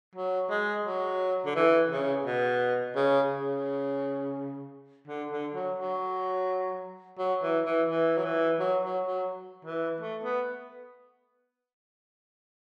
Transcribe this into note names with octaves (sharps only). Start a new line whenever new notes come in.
F#3
G#3
F#3
D3
E3
C#3
B2
C#3
C#3
D3
D3
F#3
F#3
F#3
E3
E3
E3
F#3
E3
F#3
F#3
F#3
E3
A3
B3